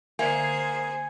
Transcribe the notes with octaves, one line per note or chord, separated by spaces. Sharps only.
D3 A#3 G#4 C5 E5 G#5 G#6 C#7